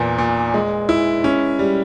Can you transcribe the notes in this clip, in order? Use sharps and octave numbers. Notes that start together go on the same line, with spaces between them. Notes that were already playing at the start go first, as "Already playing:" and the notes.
Already playing: E2 A#2
A#2
G#3
E4
C#4
G3